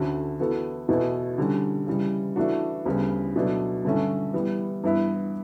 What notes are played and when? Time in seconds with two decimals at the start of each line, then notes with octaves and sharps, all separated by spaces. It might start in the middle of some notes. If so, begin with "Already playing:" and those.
Already playing: D2 D3 A3 C#4 F#4
0.40 E3 B3 F#4 A4
0.89 E2 B2 A3
1.38 D3 G3 C#4
1.87 C#3 E3 G3
2.36 E3 A3 D4 F#4
2.86 D2 C#3 G3 B3
3.36 B2 F#3 A3 D4
3.85 G2 D3 A3 C#4
4.34 E3 G3 B3
4.84 G2 E3 B3 E4 B4